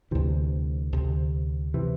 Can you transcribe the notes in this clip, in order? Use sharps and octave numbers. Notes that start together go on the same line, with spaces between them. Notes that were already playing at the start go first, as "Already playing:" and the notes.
D2 C3 E3
D2 C3
C3 E3